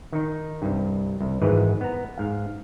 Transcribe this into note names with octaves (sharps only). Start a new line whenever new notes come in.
D#3 D#4
C2 G2
C2
G#1 G#2 E3 G#3 B4
B3 A#5
G#2 F5